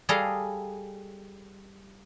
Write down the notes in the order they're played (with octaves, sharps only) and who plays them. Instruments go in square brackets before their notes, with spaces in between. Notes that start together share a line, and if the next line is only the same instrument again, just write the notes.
[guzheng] G3 G#4 A4 D#5 F5